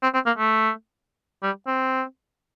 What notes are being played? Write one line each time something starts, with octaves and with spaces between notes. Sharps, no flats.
C4
C4
A#3
A3
G3
C4